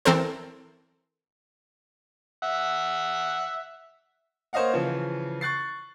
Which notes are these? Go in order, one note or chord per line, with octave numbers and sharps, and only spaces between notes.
E3 C4 A4 A#4 C5
E5 F#5
A#3 C5 C#5 D#5 F5 F#5
C#3 E3 F3
C#6 F#6 A6 C7